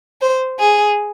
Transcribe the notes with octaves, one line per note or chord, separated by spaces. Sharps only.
C5
G#4